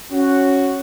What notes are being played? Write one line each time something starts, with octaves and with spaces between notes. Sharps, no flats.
C#4 F#4